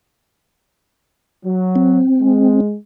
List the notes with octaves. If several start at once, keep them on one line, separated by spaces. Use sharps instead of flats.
F#3
C4
G#3